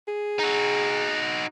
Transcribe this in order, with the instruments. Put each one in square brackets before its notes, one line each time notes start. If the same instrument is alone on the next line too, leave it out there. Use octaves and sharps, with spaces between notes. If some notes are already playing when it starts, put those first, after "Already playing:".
[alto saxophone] G#4
[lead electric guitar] D#4 F#4